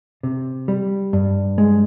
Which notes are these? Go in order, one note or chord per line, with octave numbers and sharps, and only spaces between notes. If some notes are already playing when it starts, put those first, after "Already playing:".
C3
G3
G2
G#3